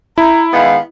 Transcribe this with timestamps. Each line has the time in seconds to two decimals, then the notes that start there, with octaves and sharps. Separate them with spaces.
0.18 E4 A#5
0.53 D#3 G#3 B3 F5